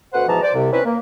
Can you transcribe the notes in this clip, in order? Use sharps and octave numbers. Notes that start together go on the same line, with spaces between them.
D2 B2 B4 C5 F#5
G#2 B2 E3 F3 A5 A#5
C5 D5
C2 C3
C4 C#4 D#4 E4 B4
A#3